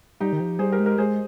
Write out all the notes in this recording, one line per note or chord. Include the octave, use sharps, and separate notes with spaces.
G3 D#4 G4
D#3
F3
G3 G#4 C5
G4 A#4
G#3
G4 A#4
G#3 G#4 C5